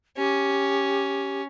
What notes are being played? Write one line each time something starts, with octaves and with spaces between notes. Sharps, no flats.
C#4 G4